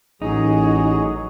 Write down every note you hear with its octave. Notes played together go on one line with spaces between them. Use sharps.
A1 F#3 D#4 F#4 G#4